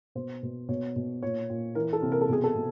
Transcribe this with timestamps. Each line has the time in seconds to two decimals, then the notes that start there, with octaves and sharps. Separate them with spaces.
0.15 B2 C5
0.43 B2
0.69 B2 C#5
0.96 B2
1.23 A#2 C#5
1.50 A#2
1.75 E3 A#4
1.93 A4
2.02 C3
2.12 A#4
2.21 A4
2.29 B2 G#4
2.44 A4
2.55 B2